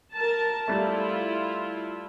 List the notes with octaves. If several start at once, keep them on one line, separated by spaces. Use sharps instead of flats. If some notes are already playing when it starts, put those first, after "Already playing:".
A#4 A5
G3 A3 E4 F4